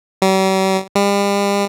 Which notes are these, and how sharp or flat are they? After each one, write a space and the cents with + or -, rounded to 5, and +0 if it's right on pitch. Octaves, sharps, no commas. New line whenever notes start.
G3 -45
G3 +40